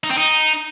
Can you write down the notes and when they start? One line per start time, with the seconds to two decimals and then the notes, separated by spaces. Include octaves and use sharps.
0.04 D#4
0.11 C4
0.18 D#4